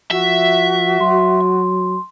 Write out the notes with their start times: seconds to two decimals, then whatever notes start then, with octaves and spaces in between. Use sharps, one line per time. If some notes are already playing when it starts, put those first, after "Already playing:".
0.11 F3 F#4 E5
1.00 F#3 C6